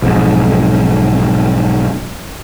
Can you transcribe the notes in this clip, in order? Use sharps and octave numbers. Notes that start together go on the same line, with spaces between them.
B1 F2 G#2